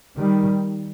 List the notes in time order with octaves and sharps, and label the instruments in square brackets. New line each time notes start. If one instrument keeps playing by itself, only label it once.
[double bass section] D#3 G3